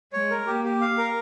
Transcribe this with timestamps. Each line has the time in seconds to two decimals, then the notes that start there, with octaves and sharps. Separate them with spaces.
0.13 G#3 C#5
0.31 A#4
0.47 A#3 G4
0.65 G4
0.81 F5
0.97 A#4